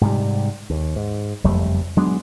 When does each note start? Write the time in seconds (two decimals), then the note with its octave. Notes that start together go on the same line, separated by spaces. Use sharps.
0.01 G#2 C3 G3
0.70 D#2
0.96 G#2
1.44 F#1 F2 G3 A3
1.97 F#3 G#3 B3 D4